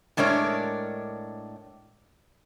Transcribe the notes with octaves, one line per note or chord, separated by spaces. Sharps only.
A2 G#3 D4 A#4 C#5